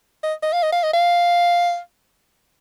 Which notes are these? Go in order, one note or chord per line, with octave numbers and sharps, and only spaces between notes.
D#5
D#5
F5
D#5
F5
D#5
F5